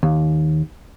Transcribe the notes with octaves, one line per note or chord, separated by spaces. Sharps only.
D#2